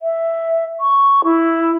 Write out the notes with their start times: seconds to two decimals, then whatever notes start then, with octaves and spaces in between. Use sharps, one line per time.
0.02 E5
0.80 C#6
1.24 E4